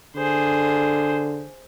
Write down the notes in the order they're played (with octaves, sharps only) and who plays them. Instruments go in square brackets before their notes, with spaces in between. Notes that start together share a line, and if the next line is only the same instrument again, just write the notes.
[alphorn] D3 [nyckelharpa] G#4 C5